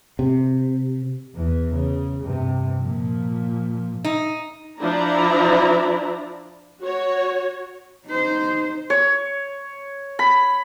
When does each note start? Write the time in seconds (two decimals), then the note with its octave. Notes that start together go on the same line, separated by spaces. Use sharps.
0.19 C3
1.34 E2 E3
1.74 C#3
2.23 G2 C3
2.82 A#2 F3
4.04 D#4
4.79 F3 D4 E4 D5 A#5
6.82 F#4 C#5
8.07 D#4 C5
8.90 C#5
10.19 B5